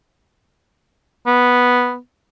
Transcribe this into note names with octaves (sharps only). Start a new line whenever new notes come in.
B3